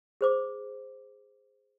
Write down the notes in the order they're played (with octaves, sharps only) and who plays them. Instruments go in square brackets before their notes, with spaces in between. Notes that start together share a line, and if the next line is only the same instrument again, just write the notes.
[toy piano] G#4 C5 D6